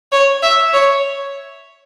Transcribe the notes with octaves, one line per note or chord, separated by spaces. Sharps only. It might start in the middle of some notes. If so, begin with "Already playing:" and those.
C#5
E5
C#5